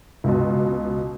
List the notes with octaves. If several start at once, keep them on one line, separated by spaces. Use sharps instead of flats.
C#2 B2